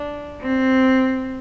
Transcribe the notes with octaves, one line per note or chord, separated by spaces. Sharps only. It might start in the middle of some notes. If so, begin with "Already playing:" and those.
Already playing: D4
C4